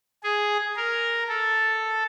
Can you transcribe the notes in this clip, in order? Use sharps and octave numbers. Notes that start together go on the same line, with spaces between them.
G#4
A#4
A4